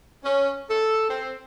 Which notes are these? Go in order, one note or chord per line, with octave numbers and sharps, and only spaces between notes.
C#4
A4
C4